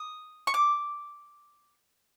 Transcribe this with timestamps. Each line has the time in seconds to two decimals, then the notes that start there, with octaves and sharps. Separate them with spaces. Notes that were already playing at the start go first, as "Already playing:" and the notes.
Already playing: D#6
0.47 C#6
0.54 D6